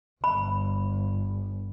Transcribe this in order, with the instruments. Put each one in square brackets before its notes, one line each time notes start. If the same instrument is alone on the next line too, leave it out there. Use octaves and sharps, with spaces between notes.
[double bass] G1 [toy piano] B5